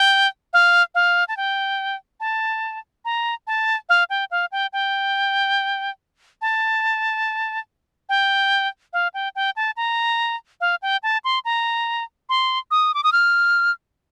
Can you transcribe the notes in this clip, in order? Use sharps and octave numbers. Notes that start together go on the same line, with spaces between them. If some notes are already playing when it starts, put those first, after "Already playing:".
Already playing: G5
F5
F5
A5
G5
A5
A#5
A5
F5
G5
F5
G5
G5
A5
G5
F5
G5
G5
A5
A#5
F5
G5
A5
C6
A#5
C6
D#6
D6
D#6
F6